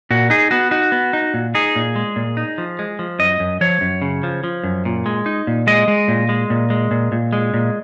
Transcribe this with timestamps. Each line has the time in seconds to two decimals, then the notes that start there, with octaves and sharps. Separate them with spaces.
0.10 A#2 F#4
0.30 D#4 G#4
0.51 B3 F#4
0.71 D#4 F#4
0.92 B3
1.13 D#4
1.34 A#2
1.55 D#4 G#4
1.76 A#2
1.96 G#3
2.16 A#2
2.37 D#4
2.58 F3
2.79 G#3
2.99 F3
3.19 F#2 D#5
3.40 F#2
3.61 F3 C#5
3.81 F#2
4.02 C#3
4.23 F3
4.44 F3
4.64 F#2
4.85 A#2
5.06 G#3
5.26 D#4
5.47 A#2
5.67 G#3 D#5
5.88 G#3
6.08 A#2
6.29 G#3
6.50 A#2
6.70 G#3
6.91 A#2
7.12 A#2
7.33 G#3
7.54 A#2